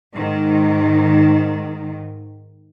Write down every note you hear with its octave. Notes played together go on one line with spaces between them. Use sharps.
G#2 D#3